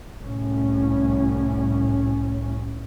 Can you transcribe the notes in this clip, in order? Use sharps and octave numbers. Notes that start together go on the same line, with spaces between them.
C2 A2 C#4